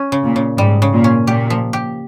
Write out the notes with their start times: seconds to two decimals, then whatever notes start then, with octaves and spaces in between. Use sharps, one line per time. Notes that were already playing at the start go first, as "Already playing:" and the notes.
Already playing: C#4
0.12 C#3
0.24 A#2
0.36 C#3
0.58 G#2 G3
0.82 C#3
0.93 A#2
1.04 C#4
1.27 A#2 G4
1.50 F3
1.73 G4